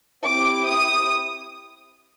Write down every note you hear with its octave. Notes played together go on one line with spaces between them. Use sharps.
C4 E4 G4 D6
D#6